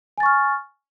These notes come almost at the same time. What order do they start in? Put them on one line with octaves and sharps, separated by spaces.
G#5 A6 C#6 F6